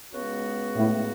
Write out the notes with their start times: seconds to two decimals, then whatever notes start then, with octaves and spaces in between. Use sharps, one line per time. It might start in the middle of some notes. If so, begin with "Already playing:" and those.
0.12 C#2 C#3 G#3 B3 F#4
0.76 A2